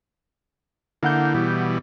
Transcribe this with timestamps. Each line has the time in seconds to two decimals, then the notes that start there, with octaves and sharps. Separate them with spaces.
1.03 D3 A#3 E4 F#5 G6
1.34 B2 E3 G3